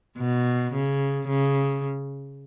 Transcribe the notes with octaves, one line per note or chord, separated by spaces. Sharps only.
B2
C#3
C#3